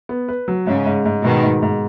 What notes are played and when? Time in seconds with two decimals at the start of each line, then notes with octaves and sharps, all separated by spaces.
0.09 B3
0.29 B4
0.48 F#3
0.67 G#2 C#3
0.86 G#2
1.05 G#2
1.24 G#2 B2 D#3
1.44 G#2
1.62 G#2